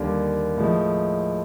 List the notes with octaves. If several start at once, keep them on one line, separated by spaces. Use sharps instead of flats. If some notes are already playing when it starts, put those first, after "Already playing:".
Already playing: D#2 D3 G3 A#3
A2 F3 G#3